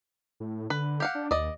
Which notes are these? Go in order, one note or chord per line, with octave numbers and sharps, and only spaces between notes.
A2
D3 B4
G4 F5 F#5
D4
D#2 D5 D#5